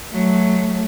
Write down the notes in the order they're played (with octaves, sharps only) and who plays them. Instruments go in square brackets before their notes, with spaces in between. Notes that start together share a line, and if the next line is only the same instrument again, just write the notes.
[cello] F#3 A3